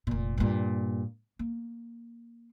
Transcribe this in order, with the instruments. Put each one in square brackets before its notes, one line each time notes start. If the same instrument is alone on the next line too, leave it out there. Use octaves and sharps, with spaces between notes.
[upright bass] F1 A#2
G2 A#2
A#3